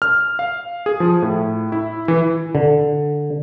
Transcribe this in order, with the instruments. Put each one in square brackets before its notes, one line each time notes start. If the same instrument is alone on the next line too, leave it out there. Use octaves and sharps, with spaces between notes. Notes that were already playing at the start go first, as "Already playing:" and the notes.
[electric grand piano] F6
F5
G#4
F3
A2
E4
E3
[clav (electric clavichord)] D3